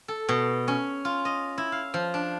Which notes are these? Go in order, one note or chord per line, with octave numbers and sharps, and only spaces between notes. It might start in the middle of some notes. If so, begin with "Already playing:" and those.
A4
B2
C#4
F4
D#5
E4
F5
F3
D4